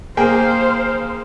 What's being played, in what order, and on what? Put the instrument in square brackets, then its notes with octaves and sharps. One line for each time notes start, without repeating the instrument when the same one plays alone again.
[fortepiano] A#3 G#4 G5 [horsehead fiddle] C5 F5